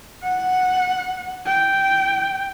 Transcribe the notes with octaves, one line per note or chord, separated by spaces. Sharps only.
F#5
G5